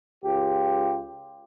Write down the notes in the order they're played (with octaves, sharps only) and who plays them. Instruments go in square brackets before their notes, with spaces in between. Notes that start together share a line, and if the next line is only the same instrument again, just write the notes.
[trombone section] C#2 F4 G4